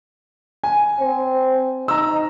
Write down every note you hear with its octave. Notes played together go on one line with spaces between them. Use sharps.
G#5
C4
D#4 A#5 E6